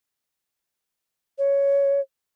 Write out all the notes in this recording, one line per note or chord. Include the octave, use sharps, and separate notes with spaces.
C#5